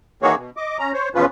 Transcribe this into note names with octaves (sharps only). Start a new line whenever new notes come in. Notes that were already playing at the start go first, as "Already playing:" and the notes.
D#3 E3 A#3 F#4 G#4 C#5
B2
D#5 D6
C#4 A#5
C5 C#5
E2 B2 F3 C#4 F4 B4